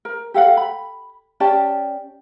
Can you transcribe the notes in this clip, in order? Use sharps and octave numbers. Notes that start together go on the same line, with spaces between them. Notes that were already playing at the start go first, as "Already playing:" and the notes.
A#4
G4 A4 F5 F#5
B5
C#4 G4 D5 A5